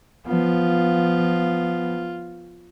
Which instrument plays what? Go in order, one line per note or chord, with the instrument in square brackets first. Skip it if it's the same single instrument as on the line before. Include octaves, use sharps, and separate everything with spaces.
[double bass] F3 B3 [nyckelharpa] F4